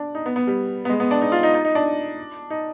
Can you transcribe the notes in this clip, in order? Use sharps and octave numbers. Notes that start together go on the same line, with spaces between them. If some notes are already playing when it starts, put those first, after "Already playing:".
Already playing: D4
D#4
B3
B3
G3
B3
G#3
B3
D4
D#4
F4
D#4
D#4
D#4
D4
D#4